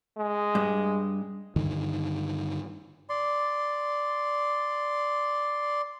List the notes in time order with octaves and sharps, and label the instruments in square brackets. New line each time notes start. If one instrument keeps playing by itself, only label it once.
[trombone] G#3
[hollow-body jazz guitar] G2
[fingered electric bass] G2 D3 D#3
[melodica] D5 C6